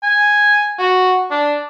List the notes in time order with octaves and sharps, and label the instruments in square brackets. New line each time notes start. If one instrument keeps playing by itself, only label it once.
[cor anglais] G#5
F#4
D4